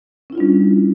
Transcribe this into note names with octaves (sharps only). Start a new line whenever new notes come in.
G3 C#4 D4 E4 F4